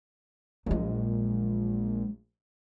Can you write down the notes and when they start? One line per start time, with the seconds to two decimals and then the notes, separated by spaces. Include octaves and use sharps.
0.66 A#1 F#3 G#3